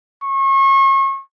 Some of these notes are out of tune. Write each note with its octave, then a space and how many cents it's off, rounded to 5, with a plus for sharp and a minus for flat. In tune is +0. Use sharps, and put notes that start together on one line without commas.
C#6 -35